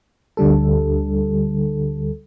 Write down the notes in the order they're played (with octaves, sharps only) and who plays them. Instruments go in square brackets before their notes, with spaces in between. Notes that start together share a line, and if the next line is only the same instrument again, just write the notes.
[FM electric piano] D2 D3 G3 A4